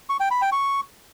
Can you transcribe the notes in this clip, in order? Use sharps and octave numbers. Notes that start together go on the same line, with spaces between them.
C#6
G5
B5
G5
C#6